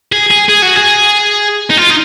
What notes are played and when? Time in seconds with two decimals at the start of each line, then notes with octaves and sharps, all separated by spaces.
0.12 G#4
0.31 G#4
0.49 G#4
0.62 F#4
0.76 G#4
1.70 D#4
1.77 F4
1.89 D#4